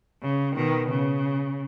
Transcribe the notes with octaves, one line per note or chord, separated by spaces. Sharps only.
C#3
B2 D#3
C#3